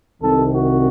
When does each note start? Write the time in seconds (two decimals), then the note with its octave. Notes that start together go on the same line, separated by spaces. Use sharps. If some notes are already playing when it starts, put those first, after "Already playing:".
0.22 C2 C3 D#3 A4
0.54 F#4